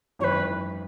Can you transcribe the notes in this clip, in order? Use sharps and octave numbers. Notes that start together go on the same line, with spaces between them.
G#1 F#2 E3 B4 C#5